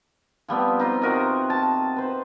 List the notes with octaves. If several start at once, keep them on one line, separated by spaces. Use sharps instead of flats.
F3 G3 B3 C4
D#4 F4 C5
C3 F#4 A#4 D#5
A5
B4 C5